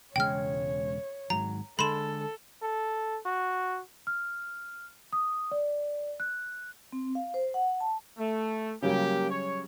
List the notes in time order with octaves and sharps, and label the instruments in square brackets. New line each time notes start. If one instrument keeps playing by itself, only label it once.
[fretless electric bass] E1 C#3 G#3 [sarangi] C#5 [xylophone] G5 F6
[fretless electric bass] G#1 G#2 F#3 [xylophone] A#5
[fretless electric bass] D3 G#3 [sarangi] A4 [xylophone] B5 C6 E7
[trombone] A4
F#4
[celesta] F6
D#6
D5
F#6
[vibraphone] C4
F5
C5
F#5
A5
[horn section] A3
[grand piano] C#3 F#3 G3 [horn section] A#3 G4
[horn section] C#5